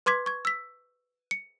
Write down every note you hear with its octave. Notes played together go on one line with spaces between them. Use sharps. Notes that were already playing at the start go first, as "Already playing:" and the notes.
B4 C6 D6 G#6 B6
C#6 G#6
E6 B6
C#7